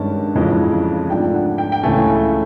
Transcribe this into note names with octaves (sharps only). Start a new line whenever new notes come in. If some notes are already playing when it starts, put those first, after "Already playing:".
Already playing: G2 D#3 G#3 C#4 A5
F2 C#3 E3 G#3
G#2 F3 A3 D4 G5
F#5
G5
G5
C#2 C#3 E3 A3 G#5